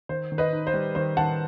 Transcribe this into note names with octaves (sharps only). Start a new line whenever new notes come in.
D#3 C5
D#3
B4 D#5
D#4
C5
G3
D#3 C5
D#3 F#5 A5